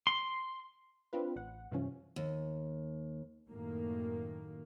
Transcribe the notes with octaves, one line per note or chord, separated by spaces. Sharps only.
C6
C4 D4 F4 B4
A1 F#5
G2 C3 E3 F3 C#4
D#2
F#2 A2 D#3 A#3